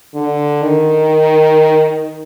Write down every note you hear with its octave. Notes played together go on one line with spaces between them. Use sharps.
D3
D#3